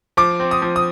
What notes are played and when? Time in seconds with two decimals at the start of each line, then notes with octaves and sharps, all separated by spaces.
0.17 F3 D6
0.40 C4
0.51 D#6
0.62 F3
0.76 D#6